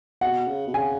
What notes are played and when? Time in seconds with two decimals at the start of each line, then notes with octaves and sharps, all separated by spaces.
0.21 B2 F#5
0.48 C#3
0.67 B2
0.74 C#3 G#5